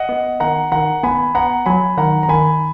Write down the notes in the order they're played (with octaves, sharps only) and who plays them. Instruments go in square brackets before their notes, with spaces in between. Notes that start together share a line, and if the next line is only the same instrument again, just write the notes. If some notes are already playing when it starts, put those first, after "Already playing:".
Already playing: [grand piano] D#5 F#5
[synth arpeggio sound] B3
[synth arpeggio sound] D#3 [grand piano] F#5 A#5
[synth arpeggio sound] D#3 [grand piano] F#5 A#5
[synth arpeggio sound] B3 [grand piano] G#5 B5
[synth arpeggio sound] B3 [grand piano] F#5 A#5
[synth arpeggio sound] F#3 [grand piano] G#5 B5
[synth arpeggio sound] D#3 [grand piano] F#5 A#5
[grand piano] A#5
[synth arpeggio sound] D#3 [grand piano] G#5 B5